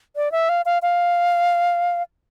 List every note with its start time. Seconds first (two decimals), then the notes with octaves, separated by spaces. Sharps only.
0.16 D5
0.32 E5
0.49 F5
0.66 F5
0.82 F5